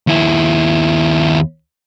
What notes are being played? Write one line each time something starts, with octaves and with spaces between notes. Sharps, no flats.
D#2 E4